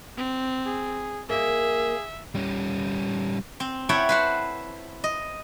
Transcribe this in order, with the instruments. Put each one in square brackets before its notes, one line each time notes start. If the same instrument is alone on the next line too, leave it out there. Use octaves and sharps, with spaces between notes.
[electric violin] C4
[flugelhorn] G#4
[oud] A#3 D#5 [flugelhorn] G#4 [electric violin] E5
[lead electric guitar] G3 C#4
[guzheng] C4
E4 A4 C#5 F#5 G5 B5
B4 C5 F#5
D#5